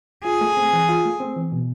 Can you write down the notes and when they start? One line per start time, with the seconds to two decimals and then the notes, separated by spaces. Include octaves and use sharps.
0.25 F4 G#4
0.41 A3
0.57 C4
0.73 E3
0.89 F4
1.05 A3
1.20 C4
1.36 E3
1.52 B2